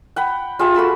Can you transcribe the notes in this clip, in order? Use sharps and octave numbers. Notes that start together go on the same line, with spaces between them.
F#5 G5 B5
F4 G4 G#4 E5
F#4 A4 B5 E6